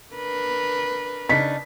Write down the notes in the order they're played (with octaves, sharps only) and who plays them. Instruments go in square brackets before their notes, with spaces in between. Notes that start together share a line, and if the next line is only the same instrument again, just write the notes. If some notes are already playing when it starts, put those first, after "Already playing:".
[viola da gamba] D4 A#4 B4
[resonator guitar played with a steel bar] C#3 D4 D#4 [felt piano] B6